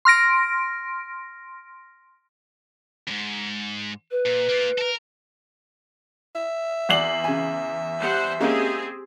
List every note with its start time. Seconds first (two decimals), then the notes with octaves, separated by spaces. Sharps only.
0.05 C6 F6 A#6 D7
3.07 F2 G#2
4.11 B4
4.26 A#2
4.49 A#3 F4
4.78 A4 A#4
6.35 E5
6.89 E2 D5 F#5 C7 F#7
7.24 C#3 G#5
7.98 G3 C5 F#5
8.40 G#3 A#3 C4 C#4 G4 G#4